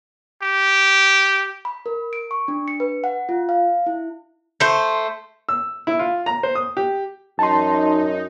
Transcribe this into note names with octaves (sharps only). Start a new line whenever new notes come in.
G4
B5
A#4
D7
C#6
D4
C#7
B4
F#5
F4
F5
E4
A3 C5
E6
E4
F4
A#5
C5
D#6
G4
F#2 D#4 A5 C6